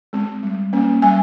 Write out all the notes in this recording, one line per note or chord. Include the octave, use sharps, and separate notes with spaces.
G#3 C4
G3
A#3 C#4
G3 G#5